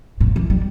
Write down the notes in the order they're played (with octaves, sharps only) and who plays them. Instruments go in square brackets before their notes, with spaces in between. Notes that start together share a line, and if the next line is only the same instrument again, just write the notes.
[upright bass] A2
E3
G3